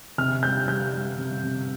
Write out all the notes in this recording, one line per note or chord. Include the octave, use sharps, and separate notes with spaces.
C3 F6
G3 G6
G3 G6
G3
C3
C3